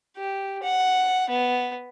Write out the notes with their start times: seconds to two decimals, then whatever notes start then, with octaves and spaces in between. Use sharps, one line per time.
0.17 G4
0.63 F#5
1.29 B3